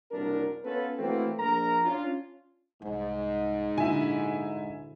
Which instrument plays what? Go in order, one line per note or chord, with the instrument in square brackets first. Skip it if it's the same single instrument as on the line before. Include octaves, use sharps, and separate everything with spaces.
[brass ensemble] F#1 C2 F#2 D4 A#4
B3 C#4 F4 A4 B4
E3 A3 A#3 C4 F#4 B4
A#1 A#4 A#5
C#4 D4 F4
[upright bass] C2 [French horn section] G#2
[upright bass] A#2 A#3 [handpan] D3 E4 F#4 [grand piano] E5 G#5
[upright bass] A#2